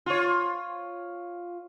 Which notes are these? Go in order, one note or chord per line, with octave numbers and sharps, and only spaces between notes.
F4 C#5